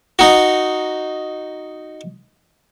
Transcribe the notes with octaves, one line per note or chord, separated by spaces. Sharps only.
D#4 F#4